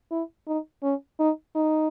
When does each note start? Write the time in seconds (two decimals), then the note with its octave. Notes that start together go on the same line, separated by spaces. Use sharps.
0.11 E4
0.47 D#4
0.83 C#4
1.19 D#4
1.56 D#4